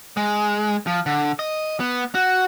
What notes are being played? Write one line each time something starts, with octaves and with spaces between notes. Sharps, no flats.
G#3
F3
D3
D#5
B3
F#4